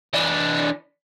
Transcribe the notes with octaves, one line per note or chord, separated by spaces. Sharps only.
E3 D4